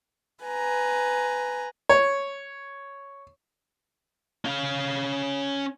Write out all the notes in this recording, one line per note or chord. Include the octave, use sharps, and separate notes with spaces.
B4 G#5 A#5
C#5
C#4 F5